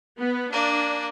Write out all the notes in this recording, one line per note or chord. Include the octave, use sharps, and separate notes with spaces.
B3
A#3 D4 D5